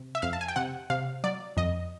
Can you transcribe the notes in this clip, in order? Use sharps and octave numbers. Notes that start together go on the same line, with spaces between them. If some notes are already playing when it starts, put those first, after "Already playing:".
Already playing: C3
E5
F2 F5
A5
G#5
G5
C3 F#5
C3 F5
F#3 D5
F2 D#5